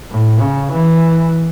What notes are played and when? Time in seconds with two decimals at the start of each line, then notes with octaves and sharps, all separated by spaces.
0.11 A2
0.41 C#3
0.71 E3